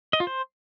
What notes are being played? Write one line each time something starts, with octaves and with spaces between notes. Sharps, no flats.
D#5
F4
C5